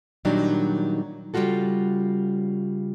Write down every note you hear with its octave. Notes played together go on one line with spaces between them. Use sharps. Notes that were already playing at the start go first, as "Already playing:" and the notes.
A#2 D#3 F#3 G3 D4 D#4
C#3 G3 A3 F4 F#4 A4